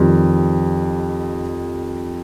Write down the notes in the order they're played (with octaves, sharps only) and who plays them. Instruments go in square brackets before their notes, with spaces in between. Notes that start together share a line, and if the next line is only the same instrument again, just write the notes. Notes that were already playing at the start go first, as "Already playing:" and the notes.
Already playing: [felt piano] F2 D#3 G3